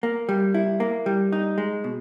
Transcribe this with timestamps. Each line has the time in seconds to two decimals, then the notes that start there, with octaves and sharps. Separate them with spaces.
0.03 A#3
0.29 G3
0.54 E4
0.80 A#3
1.06 G3
1.32 D#4
1.58 G#3
1.84 B2